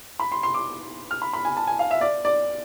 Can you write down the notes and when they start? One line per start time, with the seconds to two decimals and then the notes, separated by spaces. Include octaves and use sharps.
0.20 B5
0.32 C6
0.43 C6
0.54 D6
1.11 F6
1.22 B5
1.33 B5
1.45 G#5
1.57 A5
1.67 G#5
1.79 F5
1.91 E5
2.01 D5
2.25 D5